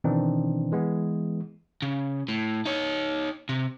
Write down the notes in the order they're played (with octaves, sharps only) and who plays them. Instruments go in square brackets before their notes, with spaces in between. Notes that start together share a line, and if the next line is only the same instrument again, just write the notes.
[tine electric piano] B2 D#3 E3 C4 D4 D#4
E3 G#3 B3
[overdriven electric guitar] C#3
A2
D#4 C#5
C3